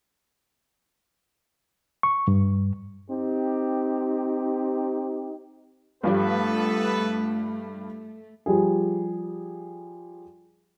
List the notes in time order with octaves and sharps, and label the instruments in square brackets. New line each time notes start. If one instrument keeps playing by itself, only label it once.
[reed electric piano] C#6
G2
[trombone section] C4 D#4 G4
[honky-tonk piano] G2 F3 G3 [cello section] A3 [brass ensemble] B3 A4 B4
[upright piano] F3 G3 G4 G#4